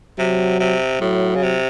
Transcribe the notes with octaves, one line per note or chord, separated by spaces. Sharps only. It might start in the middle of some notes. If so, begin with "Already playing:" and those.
C3 F#3
C3
A2 F#3
C#3
C3